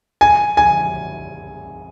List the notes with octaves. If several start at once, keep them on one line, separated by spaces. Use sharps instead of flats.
G#5
G#5